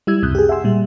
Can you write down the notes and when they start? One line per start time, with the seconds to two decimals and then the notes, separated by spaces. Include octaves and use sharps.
0.07 G3 E4 E6 G#6
0.23 C#2 F#2 C3 D#6 F#6 G6
0.35 G4 G#4
0.49 E5 F#5 G#5 C6 E6
0.64 A#2 G3